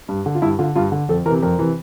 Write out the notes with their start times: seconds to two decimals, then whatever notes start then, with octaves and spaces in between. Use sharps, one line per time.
0.08 G2
0.26 D3
0.35 F4
0.42 G2 E4
0.59 D3 F4
0.75 G2 F4
0.92 D3
1.09 F2 A4
1.25 E3 A#4
1.30 C3
1.42 F2 A#4
1.59 C3 E3